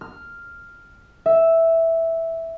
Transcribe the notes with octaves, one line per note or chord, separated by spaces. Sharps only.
F6
E5